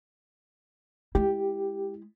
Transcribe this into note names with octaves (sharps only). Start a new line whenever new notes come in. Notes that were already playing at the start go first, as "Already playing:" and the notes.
G#3 E4 G4